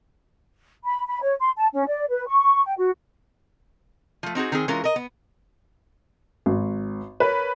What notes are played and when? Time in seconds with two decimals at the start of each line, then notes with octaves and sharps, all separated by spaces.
0.85 B5
1.08 B5
1.22 C#5
1.41 C6
1.57 A5
1.74 C#4
1.87 D5
2.09 B4
2.27 C#6
2.65 G5
2.78 F#4
4.23 F3 A3
4.35 C4 D#4 F#4 G#4
4.52 D#3 C4 G#4
4.68 E3 G#3 C#4 F4 A#4
4.84 A#4 D#5
4.96 B3
6.46 G#1
7.20 A#4 B4 C#5